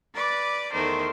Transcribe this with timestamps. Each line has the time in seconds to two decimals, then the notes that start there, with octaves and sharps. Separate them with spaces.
0.15 B4 D5 D6 A6
0.73 E2 D#3 A3 A#4 C5